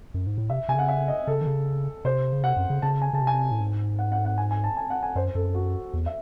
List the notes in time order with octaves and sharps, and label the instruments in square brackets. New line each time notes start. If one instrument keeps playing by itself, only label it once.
[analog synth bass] F#2
G#2
A2
[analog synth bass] C3 [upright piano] E5
[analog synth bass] C3 [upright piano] G#5
[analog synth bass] C#3 [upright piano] F#5
[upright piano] E5
D#5
[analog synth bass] C#3 [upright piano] A4
[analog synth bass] D#3
C#3
[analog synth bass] C3 [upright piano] C5
[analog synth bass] C#3
[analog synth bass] C3 [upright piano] F#5
[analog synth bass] F#2
C#3
[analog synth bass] C#3 [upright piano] A5
[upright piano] G#5
[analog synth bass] C#3 [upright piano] A5
[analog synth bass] C3
[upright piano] G#5
[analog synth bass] A2
G#2
[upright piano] F#5
F#5
F#5
G#5
G#5
A5
G#5
F#5
G#5
[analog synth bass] F#2 [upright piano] C5
[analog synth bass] F#2 [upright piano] A4
[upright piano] F#4
[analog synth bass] E2
[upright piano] E5